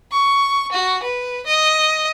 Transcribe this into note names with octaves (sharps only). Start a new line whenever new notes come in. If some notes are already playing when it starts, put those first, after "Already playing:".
C#6
F#4
B4
D#5